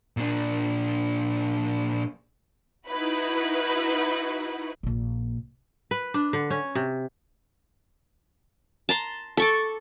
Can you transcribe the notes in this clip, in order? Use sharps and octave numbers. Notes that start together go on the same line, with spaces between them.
A#2 D4
D#4 E4 F#4 B4
A#1 A#2
B4
D4
D3
C#4
C3
A5 A#5 C6
A4 C#6 D6